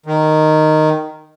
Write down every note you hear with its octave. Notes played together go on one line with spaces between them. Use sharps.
D#3